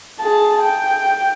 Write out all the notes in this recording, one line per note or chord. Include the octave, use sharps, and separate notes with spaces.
G#4 A5
G5